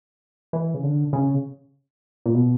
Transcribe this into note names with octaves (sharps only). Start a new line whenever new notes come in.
E3
C#3
D3
C#3
A#2
B2